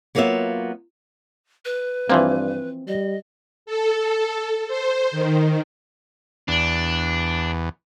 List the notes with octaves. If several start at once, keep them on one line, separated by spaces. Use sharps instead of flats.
F#3 A#3 B3 F4 C#5 E5
B4
G2 E3 F3 A#3 C4
G3 D#5
A4
C5
D#3
E2 D4